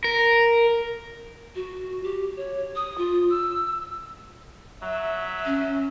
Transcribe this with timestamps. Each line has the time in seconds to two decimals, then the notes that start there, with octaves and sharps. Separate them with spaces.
0.04 A#4
1.55 F#4
2.03 G4
2.37 C#5
2.76 D#6
2.98 F4
3.30 E6
4.82 F#3 E5
5.45 C#4